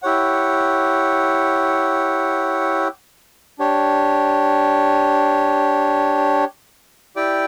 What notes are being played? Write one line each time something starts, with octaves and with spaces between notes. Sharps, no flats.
E4 G4 C#5 F#5
D4 G4 C#5
E4 G4 D5 G5